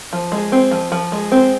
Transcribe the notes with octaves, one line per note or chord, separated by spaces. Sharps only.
F3
G#3
C4
F3
F3
G#3
C4